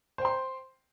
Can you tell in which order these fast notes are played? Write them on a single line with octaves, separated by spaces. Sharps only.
C5 G5 C6